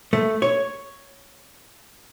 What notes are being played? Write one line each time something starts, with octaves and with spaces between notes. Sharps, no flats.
A3
C#5